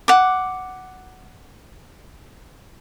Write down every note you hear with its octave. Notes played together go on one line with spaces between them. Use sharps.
F#5 D6